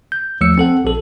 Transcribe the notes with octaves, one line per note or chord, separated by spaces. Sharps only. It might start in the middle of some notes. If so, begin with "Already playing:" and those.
G6
D#2 F3 A3 E6 C#7
C4 A4 F#5
A#1 A4